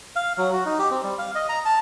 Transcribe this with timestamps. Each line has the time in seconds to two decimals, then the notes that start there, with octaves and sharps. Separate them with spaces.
0.16 F5
0.38 F#3
0.53 F#4
0.66 D#4
0.79 G4
0.91 C4
1.04 G3
1.18 F5
1.35 D#5
1.49 A#5
1.65 A5